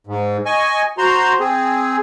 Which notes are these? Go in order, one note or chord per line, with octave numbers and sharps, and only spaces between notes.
G#2
D#5 G#5 C#6
F#4 C5 A#5 C6
C4 G#4